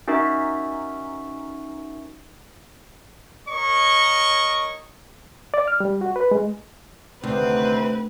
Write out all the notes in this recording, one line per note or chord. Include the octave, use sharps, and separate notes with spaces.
C#4 D#4 F#4 A#4 E5
A#4 C#5 D#5 C#6
D5
F6
G3
F#4
B4
G#3
D2 C3 D#3 C4 B4